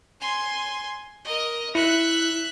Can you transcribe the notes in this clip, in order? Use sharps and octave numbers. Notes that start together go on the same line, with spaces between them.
G#5 C6
A#4 D#5
E4 E5 F#6 C#7